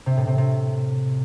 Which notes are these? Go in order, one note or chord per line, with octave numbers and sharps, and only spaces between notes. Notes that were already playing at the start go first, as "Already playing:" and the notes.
C3
A2
C3
C3